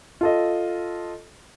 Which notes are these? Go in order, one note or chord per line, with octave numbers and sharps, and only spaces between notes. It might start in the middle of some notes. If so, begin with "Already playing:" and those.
F4 A4 D#5